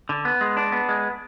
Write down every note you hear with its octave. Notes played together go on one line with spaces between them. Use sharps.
D3
B3
G#3
D4
B3
G#3